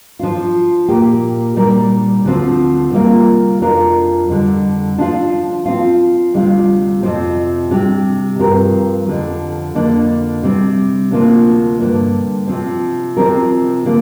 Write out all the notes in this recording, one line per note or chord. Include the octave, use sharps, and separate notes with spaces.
F3 D4 F4
A#2 A#3 G4
A#2 G3 D4 A#4
D2 D3 F3 C4
C3 G3 A#3 F4 A#4
F2 F3 D4 F4 A#4
F2 D3 G3
F3 D4 F4
F3 C4 F4
D2 C3 G3 D4 F4
F2 C3 F3 C4
C3 G3 D4 G4
G2 F3 C4 G4 A#4
F2 D3 F3
F2 D3 A#3 D4
C3 G3 C4
D2 C3 F3 A#3 D4
G2 D3 A#3
C3 F3 C4
C3 F3 C4 G4 A#4
D3 A#3